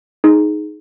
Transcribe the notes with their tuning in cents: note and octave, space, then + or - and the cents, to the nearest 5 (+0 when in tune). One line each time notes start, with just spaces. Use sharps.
D#4 +0 G#4 +15